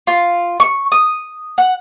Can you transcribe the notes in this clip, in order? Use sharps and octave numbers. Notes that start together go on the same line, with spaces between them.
F4
C#6
D#6
F#5